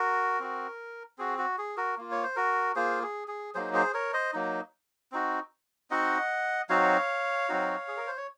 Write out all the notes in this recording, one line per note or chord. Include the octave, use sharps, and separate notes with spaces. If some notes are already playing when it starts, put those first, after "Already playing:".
Already playing: F#4 A#4
C4 F#4
C4 F#4 G#4
F#4
G#4
F#4 A#4
A#3 F4
C#5
C5
F#4 A#4
A#3 F4 G#4 C5
G#4
G#4
F#3 A#3 D#4 G#4 C5
G#4 C5
A#4 C#5
C5 D#5
F#3 A#3 D#4
C4 D#4 F#4
C4 D#4 F#4 D#5 F#5
F#3 C4 D#4 F#4 C#5 F5
F#3 C4 D#4 F#4
G#4
A#4
C5
C#5